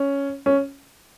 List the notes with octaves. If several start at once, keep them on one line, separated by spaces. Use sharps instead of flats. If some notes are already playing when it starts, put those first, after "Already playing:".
Already playing: C#4
C#4